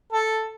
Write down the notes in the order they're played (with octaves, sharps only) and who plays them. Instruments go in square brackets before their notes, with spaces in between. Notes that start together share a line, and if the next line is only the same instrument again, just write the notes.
[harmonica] A4